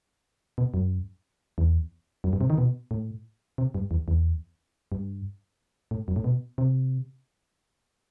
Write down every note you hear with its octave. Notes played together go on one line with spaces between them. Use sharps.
B2
F#2
E2
F#2
G2
C3
D#3
B2
A2
C3
G2
E2
E2
G2
A2
F#2
A2
B2
C3